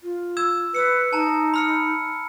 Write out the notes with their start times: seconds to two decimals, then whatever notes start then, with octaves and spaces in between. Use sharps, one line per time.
0.03 F4
0.37 E6 G#6 E7
0.75 B4 E6 C#7
1.13 D#4 A5 A#5
1.54 B5 F6 C#7